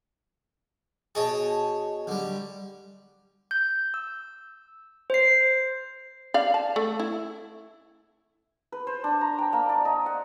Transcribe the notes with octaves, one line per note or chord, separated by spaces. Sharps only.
B2 G#4 C#5 D#5 A5
D3 G3
G6
E6
C5 C7
D5 F5
A5
A3
E4
B4
C5
D4
A#5
G5
A#3
D5
D#5
F#5